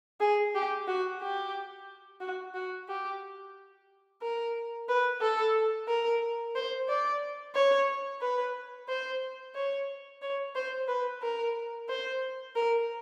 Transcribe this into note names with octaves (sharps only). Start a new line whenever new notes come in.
G#4
G4
F#4
G4
F#4
F#4
G4
A#4
B4
A4
A#4
C5
D5
C#5
B4
C5
C#5
C#5
C5
B4
A#4
C5
A#4